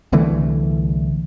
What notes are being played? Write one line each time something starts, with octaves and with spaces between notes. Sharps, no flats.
C2 D3 E3 A3